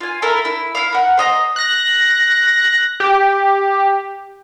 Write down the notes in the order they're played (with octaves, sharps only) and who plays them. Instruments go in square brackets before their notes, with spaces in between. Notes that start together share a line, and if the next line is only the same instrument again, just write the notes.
[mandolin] F4 G#5
E4 A4 A#4 F5
E4
E4 F5
A#4 F#5
C5 D#5 A#5
[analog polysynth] F#6 A#6
G4